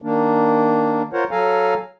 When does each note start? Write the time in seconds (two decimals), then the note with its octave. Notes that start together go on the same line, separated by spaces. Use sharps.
0.02 D#3 A#3 D4
1.13 F4 A#4 C5 C#5 F#5
1.31 F#3 A4 F5 G#5 A#5